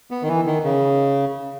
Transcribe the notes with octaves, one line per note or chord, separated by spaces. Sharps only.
B3
D#3
E3
D#3
C#3